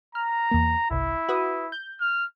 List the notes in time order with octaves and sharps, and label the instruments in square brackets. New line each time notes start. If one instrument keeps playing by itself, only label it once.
[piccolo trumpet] A#5 [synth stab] F6
[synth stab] E2 A#3
[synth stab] G1 C2 [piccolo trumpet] E4
[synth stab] F#4 B4 D#6
G6
[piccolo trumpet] F6